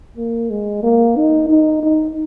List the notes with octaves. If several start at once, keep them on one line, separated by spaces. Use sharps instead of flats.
A#3
G#3
A#3
D#4
D#4
D#4